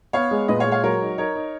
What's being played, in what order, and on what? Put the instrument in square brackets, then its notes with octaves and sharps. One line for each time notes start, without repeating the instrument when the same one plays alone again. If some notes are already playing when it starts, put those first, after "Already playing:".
[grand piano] B3 [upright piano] C#5 F5
[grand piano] G#3
[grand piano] A#2 [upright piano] B4 D#5
[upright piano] C#5 F5
[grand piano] G#3
[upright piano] C#5 F5
[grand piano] F#3 [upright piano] A#4 C#5
[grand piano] D#4
[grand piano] D#4 [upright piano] A#4 C#5
[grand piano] D#4